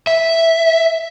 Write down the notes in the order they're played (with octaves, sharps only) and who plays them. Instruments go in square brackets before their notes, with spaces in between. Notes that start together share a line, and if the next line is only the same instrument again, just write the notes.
[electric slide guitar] E5